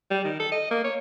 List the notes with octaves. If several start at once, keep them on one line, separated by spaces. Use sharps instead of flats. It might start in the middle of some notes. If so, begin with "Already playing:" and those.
G3
D#3
A4
D#5
A#3
C#5